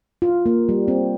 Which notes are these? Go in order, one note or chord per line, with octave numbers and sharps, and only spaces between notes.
F4
A#3
G3
C4